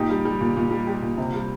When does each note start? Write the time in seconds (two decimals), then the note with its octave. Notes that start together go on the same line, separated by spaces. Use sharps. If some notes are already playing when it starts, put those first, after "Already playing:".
Already playing: A#2 D#4 G4
0.10 G3
0.25 G3
0.41 A#2
0.56 A#2
0.71 G3
0.87 G3
1.02 A#2
1.18 C3
1.34 G3